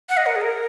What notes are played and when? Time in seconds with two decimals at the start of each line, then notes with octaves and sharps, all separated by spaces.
0.09 F#5
0.17 D#5
0.26 A#4
0.36 G#4
0.41 A#4